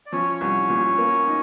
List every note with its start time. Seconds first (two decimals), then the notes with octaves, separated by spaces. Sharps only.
0.06 D5
0.12 F3 C#4 C#5
0.41 C2
0.69 A#2
0.98 A#3
1.27 D#4